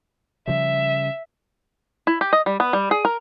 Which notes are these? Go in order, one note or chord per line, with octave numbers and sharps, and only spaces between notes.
C#3 F3 G3 E5
E4
G4
D#5
G3
B3
G3
G#4
A#4